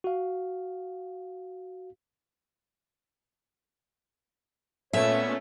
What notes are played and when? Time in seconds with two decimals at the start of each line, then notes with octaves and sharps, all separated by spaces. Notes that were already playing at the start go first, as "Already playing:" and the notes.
0.04 F#4 F5
4.93 A#2 A3 B3 C#4 C#5 E5